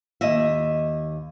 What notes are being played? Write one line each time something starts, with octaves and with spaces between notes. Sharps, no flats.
D#2 D#5 E5